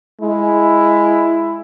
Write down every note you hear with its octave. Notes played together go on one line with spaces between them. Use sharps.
G#3 E4